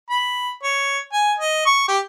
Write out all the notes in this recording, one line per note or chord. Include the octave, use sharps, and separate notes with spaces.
B5
C#5
G#5
D#5
C#6
G4